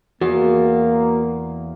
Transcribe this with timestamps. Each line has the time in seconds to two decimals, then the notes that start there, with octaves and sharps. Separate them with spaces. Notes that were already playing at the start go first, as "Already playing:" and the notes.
0.21 E2 A#3 F#4